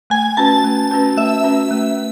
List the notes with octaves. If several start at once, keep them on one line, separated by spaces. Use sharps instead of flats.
A3 G#5
C#4 F#4 B4 A5
A3
C#4 F#4 B4
A3 E5
C#4 F#4 B4
A3